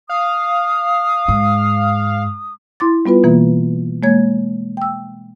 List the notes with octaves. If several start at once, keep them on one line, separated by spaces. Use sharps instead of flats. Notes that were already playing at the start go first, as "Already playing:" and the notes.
F5 D#6
G#2
E4 C6 D6 A6
G3 B3 F4 B4
B2 E3 A#3
G#3 A#3 C#5 G#6
G5 E6